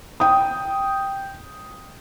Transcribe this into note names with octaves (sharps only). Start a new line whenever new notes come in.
G5 D#6